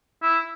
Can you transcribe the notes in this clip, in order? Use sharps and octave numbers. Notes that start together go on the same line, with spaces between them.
E4